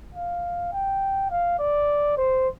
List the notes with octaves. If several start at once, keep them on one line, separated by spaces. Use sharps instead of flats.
F5
G5
F5
D5
C5